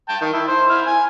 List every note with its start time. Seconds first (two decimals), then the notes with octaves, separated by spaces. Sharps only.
0.09 G5 A5
0.21 D#3
0.33 E4
0.48 C5
0.69 E4 F6
0.87 G#5